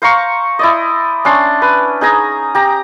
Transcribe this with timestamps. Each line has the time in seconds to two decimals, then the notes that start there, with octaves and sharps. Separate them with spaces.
0.02 C5 F5 A#5 C#6
0.59 E4 D5 D#5
1.25 C#4 D4 C6
1.62 B4
2.01 D#4 G#4 G#5 A#5
2.55 G4 A#5